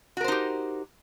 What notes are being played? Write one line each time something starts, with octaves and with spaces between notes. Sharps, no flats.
D#4 F#4 G4 A#4 C5